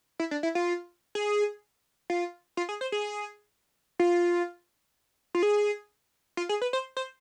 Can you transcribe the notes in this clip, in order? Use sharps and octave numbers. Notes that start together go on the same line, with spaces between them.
E4
D4
E4
F4
G#4
F4
F4
G#4
C5
G#4
F4
F4
G#4
F4
G#4
B4
C5
C5